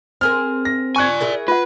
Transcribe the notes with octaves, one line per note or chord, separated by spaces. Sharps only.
C4 G#4 A#4 F6
A#6
D5 G#5 C#6 F#6 G#6
E4 G#4 A#4
F4 B4 F#5